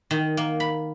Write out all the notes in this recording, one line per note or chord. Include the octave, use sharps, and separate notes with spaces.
D#3
A#3
B5